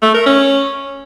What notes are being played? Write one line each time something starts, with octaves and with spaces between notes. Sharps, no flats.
A3
A#4
C#4